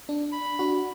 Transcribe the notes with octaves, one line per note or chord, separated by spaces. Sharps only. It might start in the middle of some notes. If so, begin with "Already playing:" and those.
D4
B5
D4 F#4